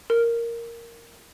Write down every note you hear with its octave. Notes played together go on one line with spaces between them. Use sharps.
A#4